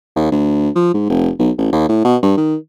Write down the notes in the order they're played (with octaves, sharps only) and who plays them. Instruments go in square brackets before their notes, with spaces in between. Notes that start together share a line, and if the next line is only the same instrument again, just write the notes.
[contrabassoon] D#2
D2
F3
G#2
F1
B1
A1
D#2
A2
B2
G2
D#3